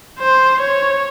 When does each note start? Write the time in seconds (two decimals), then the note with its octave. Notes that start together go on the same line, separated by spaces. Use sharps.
0.19 C5
0.61 C#5